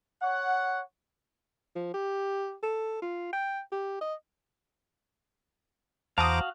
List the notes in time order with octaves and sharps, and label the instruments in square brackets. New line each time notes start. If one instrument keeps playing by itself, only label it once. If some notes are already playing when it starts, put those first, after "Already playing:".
[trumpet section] C#5 F#5
[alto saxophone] F3
G4
A4
F4
G5
G4
D#5
[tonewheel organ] E2 [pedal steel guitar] F#4 F5 [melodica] C5 A#5 D6 [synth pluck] A5 D#6